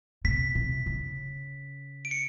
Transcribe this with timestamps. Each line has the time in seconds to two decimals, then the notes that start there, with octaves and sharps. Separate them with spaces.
0.24 C3 B6
0.55 C3
0.86 C#3
2.05 D7
2.11 C#7